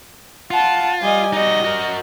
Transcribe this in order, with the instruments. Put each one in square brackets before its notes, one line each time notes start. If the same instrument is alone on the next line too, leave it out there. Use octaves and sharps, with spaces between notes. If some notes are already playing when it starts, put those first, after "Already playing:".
[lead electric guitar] F4 [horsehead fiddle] F#5 A5
[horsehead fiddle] G3 [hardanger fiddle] D#5 G#5
[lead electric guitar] D#4 F#4 [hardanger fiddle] D#5
[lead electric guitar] F#4 A#4